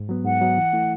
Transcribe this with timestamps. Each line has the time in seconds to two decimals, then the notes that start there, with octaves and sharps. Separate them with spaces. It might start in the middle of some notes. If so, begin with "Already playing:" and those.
Already playing: G#2
0.09 F#3 B3
0.25 G#2 F#5
0.41 F#3 B3
0.57 E3
0.73 A3 E4